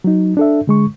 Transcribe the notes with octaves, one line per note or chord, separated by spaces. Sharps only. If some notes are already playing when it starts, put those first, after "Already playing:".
F#3 D#4
D4 A4 E5
D3 G#3 C#6